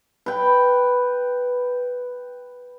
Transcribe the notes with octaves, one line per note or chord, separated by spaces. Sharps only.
B4 G5